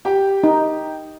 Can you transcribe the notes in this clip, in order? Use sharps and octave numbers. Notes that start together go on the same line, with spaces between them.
G4 G5
D#4